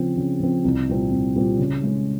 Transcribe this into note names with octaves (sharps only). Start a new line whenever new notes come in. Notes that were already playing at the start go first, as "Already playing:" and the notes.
Already playing: C#3 F3 C4
C#3
F3 C4
C2
A#2 G3 C4
C2
A#2 G3 C4
C#3
G#3 C#4